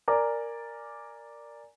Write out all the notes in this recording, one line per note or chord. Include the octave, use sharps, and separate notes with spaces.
A#4 D5 G#5 A#5 D6